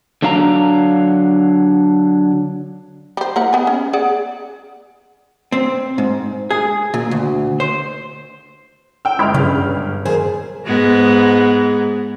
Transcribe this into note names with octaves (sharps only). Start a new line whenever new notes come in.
D3 F#3 D4 F5 A5 A#5
G3 C5
A#3 E4 F#5
B3 G#5
C#4
G#4 D5 F#5
C4
G#2
G#4
A#2
D2
C5
G5 E6
G1 G#3 E4 F6
G2 C#3
D#2 G#4 C5
G#2 G#3 B3